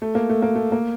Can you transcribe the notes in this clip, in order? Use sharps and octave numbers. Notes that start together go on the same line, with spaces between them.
A3
A#3
A3
A#3
A3
A#3